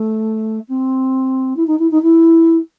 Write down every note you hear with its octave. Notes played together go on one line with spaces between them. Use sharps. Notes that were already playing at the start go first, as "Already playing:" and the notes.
Already playing: A3
C4
E4
D#4
E4
D#4
E4